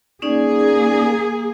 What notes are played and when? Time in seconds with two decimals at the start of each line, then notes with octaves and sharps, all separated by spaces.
0.22 A#3 C#4 D#4 G#4 D5